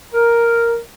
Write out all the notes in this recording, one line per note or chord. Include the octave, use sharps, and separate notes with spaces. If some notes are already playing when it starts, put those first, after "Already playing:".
A#4